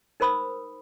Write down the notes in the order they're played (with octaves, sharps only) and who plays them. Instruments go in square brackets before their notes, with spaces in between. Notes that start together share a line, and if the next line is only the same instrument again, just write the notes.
[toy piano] D#4 A#4 C5 B5 D#6 E6